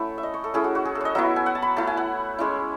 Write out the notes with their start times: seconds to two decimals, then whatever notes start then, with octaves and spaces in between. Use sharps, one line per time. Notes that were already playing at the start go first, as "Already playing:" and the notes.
Already playing: A3 C#4 E4 F#5
0.18 E5
0.23 D#5
0.34 C#5
0.44 A4
0.54 A3 C#4 E4 G#4
0.64 F#4
0.75 F#4
0.85 G#4
0.95 A4
1.01 C#5 D#5
1.15 F#3 B3 E4 E5
1.36 G#5
1.46 F#5
1.55 A5
1.62 B5
1.76 A3 E4 A5
1.87 G#5
1.97 F#5
2.39 G#3 C#4 E4